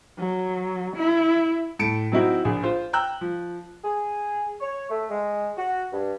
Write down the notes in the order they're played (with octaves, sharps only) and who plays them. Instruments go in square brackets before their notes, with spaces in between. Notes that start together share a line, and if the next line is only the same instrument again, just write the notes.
[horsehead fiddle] F#3
E4
[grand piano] A2 A5 C#7 D7
F#3 C4 D#4 E4 F#4
A#1 G#4
F4 C5 F5
G5 A#5 E6 F#6
F3
[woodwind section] G#4
C#5
A3
G#3
F#4
G2